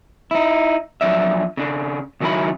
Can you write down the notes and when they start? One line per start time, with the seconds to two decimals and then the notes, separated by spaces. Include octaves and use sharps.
0.31 D#4 E4
1.01 F3 F#3 D4 D5 E5
1.57 C#3 D4
2.20 C#2 D#3 F#3 C#4 E4 B5